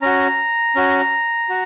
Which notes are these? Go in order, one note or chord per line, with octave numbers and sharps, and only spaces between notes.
C#4 F#4 A#5
C#4 F#4
F#4